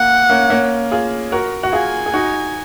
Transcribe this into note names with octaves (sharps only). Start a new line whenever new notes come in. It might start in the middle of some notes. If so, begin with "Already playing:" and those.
Already playing: A#3 F#5
A#3 C#4
A#3 C#4
F4 G#4
F#4 A#4
F#4
F4 G#4 G#5
G#4
D#4 F#4